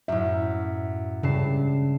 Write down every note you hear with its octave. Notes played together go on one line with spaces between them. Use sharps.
F#2 A2 E5
G2 C#3 A5 C7